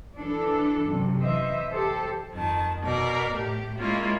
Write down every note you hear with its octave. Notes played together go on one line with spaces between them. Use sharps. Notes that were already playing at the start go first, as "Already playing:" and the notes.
E3 D4 A4
F#2 C3
E3 C5 D#5 E5
G4 A4 C5
F2 D#3 A5
B2 A#4 D5
A2 G4
G#3 A#3 C#4 E4 F4